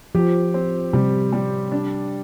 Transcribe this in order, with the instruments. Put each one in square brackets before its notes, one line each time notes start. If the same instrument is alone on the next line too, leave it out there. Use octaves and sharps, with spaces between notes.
[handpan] F3 [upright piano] G4
[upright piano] C4
[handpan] C3 [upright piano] G3
[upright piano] G3
D4